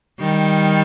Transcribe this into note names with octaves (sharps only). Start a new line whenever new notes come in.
D#3 G3